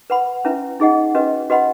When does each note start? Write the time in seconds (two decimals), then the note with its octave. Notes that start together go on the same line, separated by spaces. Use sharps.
0.10 B4 F#5 B5
0.45 C#4 E4 B4 E5
0.80 D#4 G#4 D#5 F#5
1.15 C#4 F#4 B4 D#5
1.50 F#4 B4 D#5 F#5 B5